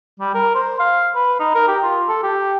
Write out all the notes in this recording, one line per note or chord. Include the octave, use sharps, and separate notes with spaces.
G3
A#4
C5
F5
B4
D#4
A#4
G4
F4
A4
G4